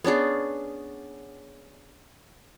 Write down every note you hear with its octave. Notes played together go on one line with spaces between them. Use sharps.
B3 C#4 D4 G#4